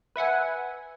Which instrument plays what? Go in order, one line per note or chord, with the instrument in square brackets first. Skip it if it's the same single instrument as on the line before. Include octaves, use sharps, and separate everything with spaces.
[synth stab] B4 E5 F#5 G#5